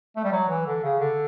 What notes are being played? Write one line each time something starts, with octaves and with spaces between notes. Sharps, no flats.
A3
G3
F#3
E3
D3
C#3
D3